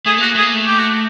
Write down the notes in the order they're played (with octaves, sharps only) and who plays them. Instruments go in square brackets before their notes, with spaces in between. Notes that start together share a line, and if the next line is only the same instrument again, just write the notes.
[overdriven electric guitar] A3 [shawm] G#4
[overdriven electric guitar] A#3 [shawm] F#4
[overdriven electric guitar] A3
[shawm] G#4
[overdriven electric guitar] A#3
A3
[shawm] G4
F#4